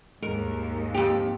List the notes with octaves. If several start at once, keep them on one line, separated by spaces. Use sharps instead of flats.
D#2 G#2 G#3 A#4
F2 G4